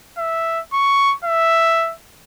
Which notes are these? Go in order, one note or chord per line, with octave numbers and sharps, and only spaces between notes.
E5
C#6
E5